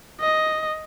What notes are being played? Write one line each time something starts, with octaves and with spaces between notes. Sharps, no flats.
D#5